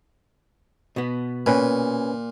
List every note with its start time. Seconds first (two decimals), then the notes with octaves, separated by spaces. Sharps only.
0.96 B2 B3
1.46 A#2 C#4 B4 G#5